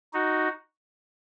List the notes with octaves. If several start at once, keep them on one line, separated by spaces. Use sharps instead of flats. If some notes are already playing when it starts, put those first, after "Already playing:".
D#4 F#4